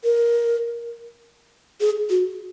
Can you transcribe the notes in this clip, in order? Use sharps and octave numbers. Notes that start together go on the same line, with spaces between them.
A#4
G#4
F#4